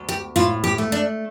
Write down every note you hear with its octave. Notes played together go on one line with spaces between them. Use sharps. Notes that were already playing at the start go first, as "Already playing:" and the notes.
Already playing: D2
G4
A2 F4
G4
A3
D4